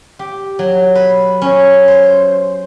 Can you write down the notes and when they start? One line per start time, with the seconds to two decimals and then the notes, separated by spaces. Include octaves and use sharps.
0.19 G4
0.59 F#3
0.95 B4
1.42 C#4
1.88 C5